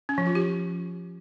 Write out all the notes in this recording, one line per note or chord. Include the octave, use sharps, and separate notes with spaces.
C#4
F3
F4
G4